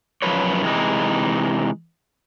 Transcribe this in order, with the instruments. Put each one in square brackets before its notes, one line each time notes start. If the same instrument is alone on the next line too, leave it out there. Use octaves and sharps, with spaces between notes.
[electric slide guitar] F#2 C3 F3 B4 C#5
C3 E3 G#3 D#4